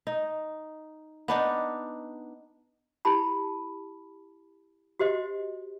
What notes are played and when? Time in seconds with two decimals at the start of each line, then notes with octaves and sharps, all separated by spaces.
0.07 D#4
1.28 B3 D4 D#4
3.05 E4 G4 A5 B5
4.99 F#4 G4 C5 D#5